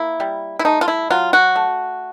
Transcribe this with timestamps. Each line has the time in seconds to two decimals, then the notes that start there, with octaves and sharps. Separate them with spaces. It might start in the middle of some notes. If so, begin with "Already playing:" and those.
Already playing: A#3 E4
0.20 G3
0.59 E4
0.65 A3 D#4
0.81 F4
0.88 E4
1.10 F#3 F4
1.33 F#4
1.56 A3